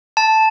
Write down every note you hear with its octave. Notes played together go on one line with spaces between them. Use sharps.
A5